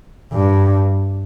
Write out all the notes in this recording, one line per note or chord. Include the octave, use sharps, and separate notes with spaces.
G2